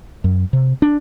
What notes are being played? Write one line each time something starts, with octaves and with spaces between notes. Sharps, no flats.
F#2
C3
D4